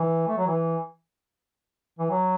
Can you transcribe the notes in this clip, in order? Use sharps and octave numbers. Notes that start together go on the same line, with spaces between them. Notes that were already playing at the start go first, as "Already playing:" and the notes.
Already playing: E3
A3
F#3
E3
E3
F#3